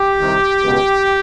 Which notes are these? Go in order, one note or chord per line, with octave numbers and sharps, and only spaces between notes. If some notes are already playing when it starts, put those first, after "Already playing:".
Already playing: G4
C2 C3 D#3
C#2 B2